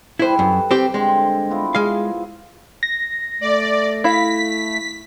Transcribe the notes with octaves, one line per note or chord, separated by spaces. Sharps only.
G3 E4 A4 B4 C5
F#2
C4 G4
D3 G#3 C4
B3 E4 F4
G#3 F5
A#6
A3 D5
E4 F5 B6